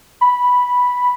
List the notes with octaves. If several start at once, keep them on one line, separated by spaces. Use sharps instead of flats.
B5